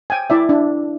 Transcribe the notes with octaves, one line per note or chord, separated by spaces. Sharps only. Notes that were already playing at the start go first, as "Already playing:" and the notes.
G5 G#5
E4 D5 E5
D4